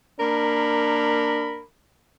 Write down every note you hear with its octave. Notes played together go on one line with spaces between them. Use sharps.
A#3 D4 A#4 B5